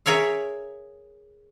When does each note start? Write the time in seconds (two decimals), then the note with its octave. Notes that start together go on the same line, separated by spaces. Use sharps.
0.06 G#4 A#4 C#5 E5 F5